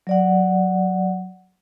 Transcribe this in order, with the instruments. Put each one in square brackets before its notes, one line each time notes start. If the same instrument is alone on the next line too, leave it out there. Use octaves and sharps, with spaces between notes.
[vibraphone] F#3 D5 F#5